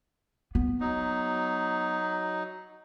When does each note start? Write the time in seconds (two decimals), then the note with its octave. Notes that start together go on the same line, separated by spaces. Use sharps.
0.55 B3
0.80 F#3 D#4